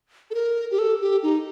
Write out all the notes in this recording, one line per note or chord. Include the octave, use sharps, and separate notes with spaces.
A4
A#4
G4
A4
G4
D#4